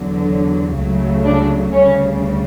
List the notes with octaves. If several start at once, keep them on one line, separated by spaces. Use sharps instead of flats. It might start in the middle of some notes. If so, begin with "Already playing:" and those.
Already playing: E2 D3 F#3
C#2 C#3 F#3 A3
D4
D2 C#3 G3 C#4